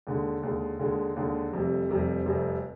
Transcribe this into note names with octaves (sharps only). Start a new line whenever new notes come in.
D#2 D3 G#3
D#2 D3 G#3
D#2 D3 G#3
D#2 D3 G#3
F1 F2 C3 G3
F1 F2 C3 G3
F1 F2 C3 G3